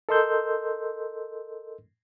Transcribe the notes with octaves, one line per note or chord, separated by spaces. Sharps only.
A4 A#4 D#5 C6 E6 G6